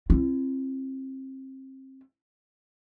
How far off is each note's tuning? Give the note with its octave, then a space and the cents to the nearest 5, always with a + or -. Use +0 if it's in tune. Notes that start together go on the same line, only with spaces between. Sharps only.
C4 +25 E4 +40